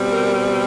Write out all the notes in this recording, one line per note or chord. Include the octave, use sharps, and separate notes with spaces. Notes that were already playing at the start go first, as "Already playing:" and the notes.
Already playing: B2 G3 C4
A#4